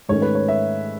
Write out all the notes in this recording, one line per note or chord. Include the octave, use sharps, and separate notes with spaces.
G#2 D#3 A3 C#4 C#5
B4
C#5
E5